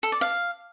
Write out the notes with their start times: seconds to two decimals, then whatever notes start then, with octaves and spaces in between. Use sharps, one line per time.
0.03 A4
0.12 D5
0.21 F5